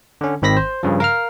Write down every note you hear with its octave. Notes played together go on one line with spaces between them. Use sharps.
D3 C#4
G#1 D#3 C4 B5 A#6 B6
C5
G2 C#3 F3
A#4 F5 F6